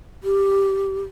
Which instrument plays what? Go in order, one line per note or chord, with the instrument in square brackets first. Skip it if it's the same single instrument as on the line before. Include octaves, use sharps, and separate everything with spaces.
[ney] G4